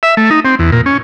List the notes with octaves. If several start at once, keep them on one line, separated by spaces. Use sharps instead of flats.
E5
A3
D#4
C4
E2
A#2
C#4